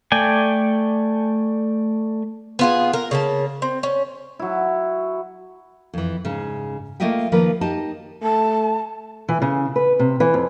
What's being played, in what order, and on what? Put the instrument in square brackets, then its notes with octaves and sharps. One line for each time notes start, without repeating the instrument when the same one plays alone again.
[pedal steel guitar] A3 D5 G5 G#5
[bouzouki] B3 F4 G#4
A#4
C#3 A#3 A5
C4
C#4
[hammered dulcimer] F#3 E4
[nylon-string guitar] F2 E3
G#2 C#3
A3 A#3 F4 D#5 E5 G5
D#3 F3 A#3 A#4 B4
D#4 G4 D#5 A5
[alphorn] A3 [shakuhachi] A5
[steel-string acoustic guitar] E3
C#3
B4
C3
E3
F2